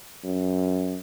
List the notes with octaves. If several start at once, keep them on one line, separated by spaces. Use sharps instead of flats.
F#2